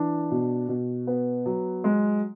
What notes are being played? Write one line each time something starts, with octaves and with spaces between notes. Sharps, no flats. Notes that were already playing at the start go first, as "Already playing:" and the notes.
Already playing: E3 D4
B2
B2
B3
F#3
G#3